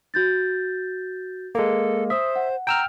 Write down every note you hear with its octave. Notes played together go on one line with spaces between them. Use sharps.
F#4 G6 A6
G#3 A#3 A4
C5 E5 D#6
F#5
G5 A#5 E6 F6